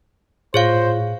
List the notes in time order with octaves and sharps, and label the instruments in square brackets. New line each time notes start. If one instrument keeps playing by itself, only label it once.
[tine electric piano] A2 [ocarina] F4 [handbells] G#4 C#5 F5 [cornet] C5